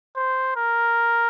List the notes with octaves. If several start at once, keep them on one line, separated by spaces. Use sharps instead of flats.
C5
A#4